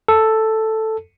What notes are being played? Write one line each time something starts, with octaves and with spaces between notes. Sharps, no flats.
A4